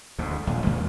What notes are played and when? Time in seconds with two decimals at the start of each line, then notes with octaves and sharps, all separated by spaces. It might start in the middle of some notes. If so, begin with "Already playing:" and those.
0.19 D2 G#2
0.47 D#1 A#1
0.64 E2 G#3 A#3